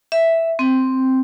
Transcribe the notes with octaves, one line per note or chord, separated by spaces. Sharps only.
E5
C4